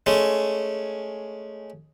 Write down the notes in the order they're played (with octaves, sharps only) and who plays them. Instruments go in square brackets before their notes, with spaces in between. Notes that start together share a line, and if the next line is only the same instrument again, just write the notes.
[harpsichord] G#3 A3 C#4